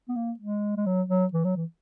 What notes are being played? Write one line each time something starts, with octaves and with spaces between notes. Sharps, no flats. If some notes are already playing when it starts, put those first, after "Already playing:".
B3
A#3
G#3
G#3
F#3
F#3
E3
F#3
E3